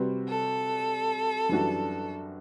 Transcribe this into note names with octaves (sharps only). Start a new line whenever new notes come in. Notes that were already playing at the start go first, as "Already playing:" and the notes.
Already playing: C3 G3 C4 F#4 B4
A4
F#2 E3 G3 D4 F#4